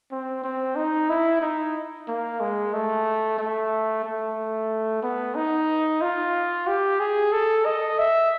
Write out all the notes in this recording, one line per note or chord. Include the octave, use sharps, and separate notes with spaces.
C4
C4
D#4
E4
D#4
A#3
G#3
A3
A3
A3
B3
D#4
F4
G4
G#4
A4
D#5
E5